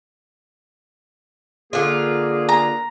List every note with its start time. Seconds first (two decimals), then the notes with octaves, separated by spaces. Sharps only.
1.73 D3 A#3 F4 G#4
2.49 A#5